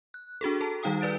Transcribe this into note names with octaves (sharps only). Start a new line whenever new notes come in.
F#6
D4 F#4 G#4 A4
A4 A5 A#5
D#3 G3 D#4 F5 G5 D#6
D#4 B4 D5 A6 D7